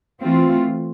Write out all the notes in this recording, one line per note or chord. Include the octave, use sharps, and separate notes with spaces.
E3 A3 C4 F4